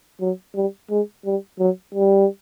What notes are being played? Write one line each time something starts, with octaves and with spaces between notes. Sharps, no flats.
F#3
G3
G#3
G3
F#3
G3